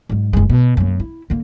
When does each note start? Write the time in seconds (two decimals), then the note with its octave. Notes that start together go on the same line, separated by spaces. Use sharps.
0.09 G#2 F#3
0.33 F#1 G#3
0.50 B2
0.77 F#2 A#3
1.00 E4
1.30 D3 A#3